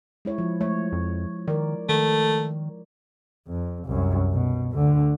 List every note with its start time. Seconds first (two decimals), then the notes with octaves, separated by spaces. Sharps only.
0.25 G#3 E4 C#5
0.38 F3
0.61 A3 C#5
0.92 F2
1.48 D#3 A#4 D5
1.89 D#3 A3
3.47 F2
3.86 C2 F#2
4.33 B2
4.72 D2 D3